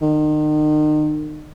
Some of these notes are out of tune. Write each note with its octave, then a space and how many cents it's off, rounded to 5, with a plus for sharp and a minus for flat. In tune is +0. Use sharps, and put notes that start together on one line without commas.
D#3 -35